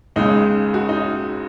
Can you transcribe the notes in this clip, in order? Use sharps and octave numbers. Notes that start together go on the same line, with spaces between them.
C#2 C#3 G#3 D#4
F#4
D#4